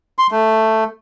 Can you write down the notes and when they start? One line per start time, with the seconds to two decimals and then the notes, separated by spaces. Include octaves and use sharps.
0.18 C6
0.31 A3